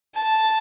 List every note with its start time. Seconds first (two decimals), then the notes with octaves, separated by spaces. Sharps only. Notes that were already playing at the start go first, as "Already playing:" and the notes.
0.15 A5